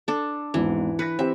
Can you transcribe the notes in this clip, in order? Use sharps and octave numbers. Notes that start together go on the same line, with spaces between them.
D4 A4
G#1 E2 G#2 E3
B4 A#6 B6 C#7
C4 G4 E5